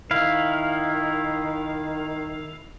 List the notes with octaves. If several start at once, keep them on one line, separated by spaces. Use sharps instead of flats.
D#3 E4 F5